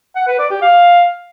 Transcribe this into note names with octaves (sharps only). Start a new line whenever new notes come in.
F#5
B4
D5
G4
F5